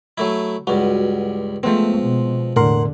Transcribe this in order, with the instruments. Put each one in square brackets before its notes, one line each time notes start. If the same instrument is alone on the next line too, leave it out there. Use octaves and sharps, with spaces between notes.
[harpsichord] F#3 A3 E4
[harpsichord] C#2 G2 [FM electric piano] F#4
[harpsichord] F3 C4 [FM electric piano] G#3 B3 [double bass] A3
[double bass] B2
[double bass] E2 D3 [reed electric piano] A2 A#4 C6 [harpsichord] F#5